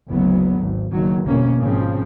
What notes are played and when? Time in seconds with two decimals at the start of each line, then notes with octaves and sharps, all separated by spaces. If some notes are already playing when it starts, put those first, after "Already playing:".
0.10 F#1 D2 F#3 B3
0.58 G#1
0.92 F#1 D#3 F#3
1.24 G1 F2 B2 A#3 C#4
1.61 G#1 C#3 F3 C4